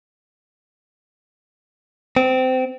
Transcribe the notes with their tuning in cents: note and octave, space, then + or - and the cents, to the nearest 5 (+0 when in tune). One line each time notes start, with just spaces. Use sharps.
C4 -20